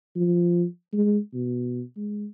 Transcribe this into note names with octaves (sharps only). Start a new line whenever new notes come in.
F3
G#3
B2
G#3